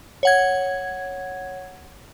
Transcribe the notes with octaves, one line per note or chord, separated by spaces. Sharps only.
C#5 F#5 G#6